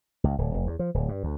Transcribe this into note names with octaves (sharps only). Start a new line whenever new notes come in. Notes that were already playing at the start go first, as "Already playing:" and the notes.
C#2
D1
F1
E2
F3
D1
G2
D2